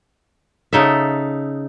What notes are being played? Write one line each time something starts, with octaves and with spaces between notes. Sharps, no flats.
C#3 D#4 A4 E5